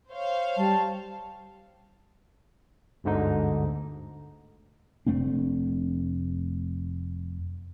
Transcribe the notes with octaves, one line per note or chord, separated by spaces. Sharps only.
C5 C#5 F5
G3 A5
G1 D2 G#2 D3 D#4
F1 A3 C4 D4